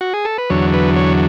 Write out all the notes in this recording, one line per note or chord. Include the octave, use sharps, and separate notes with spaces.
F#4
G#4
A4
B4
E2 D3 F#3 C#5
B4
C#5